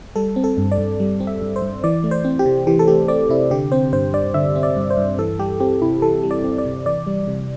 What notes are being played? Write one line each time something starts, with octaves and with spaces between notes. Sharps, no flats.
G3 A4
C4
A4
G2
D5
G2
G3
C4
E5
G2
C5
G2
E3 D5
A3
C5
C4
G4
C3
E3 G4
A4
A3 G4
C4 D5
C3 E4
D3 G4
C4 C5
G2 C5
G2 D5
D3 E5
C4
D5
G2
C5
G2
E3 A4
G3 G4
C4 G4
C3 E4
E3 A4
G3
D5
C4
D5
C3
E3 D5
G3
C3